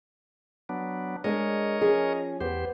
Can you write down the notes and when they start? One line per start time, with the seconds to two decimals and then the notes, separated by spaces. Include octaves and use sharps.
0.69 F#3 B3 D4
1.24 G#3 D4 G#4 A#4 C#5 D#5
1.81 F3 C#4 G#4
2.41 E2 B3 G4 C5